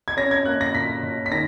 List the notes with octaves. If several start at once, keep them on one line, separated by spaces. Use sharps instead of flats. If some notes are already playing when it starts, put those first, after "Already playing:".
G#6
C#4 A#6
G#6
A#3 F#6
A#6
A#2 B6
A#2
B6
D#3 A#6